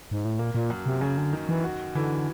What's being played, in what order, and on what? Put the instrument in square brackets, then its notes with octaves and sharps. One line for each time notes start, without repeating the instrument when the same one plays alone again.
[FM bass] G#2
A2
[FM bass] A#2 [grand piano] A#3
[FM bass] A#2
[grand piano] F#2
[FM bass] C3
[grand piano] F#2 [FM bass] C#3
[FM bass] D3
[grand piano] D#3
[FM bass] E3
[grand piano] F#4
[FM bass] D3 [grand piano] E3